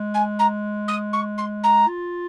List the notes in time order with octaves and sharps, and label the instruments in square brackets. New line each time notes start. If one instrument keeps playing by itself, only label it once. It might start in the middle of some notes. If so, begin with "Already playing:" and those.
Already playing: [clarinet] G#3
[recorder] G#5
A#5
D#6
C#6
C6
A#5
[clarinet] F4